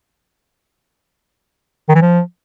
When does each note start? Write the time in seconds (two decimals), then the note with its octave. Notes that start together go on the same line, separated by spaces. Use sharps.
1.89 D#3
1.95 E3
2.02 F3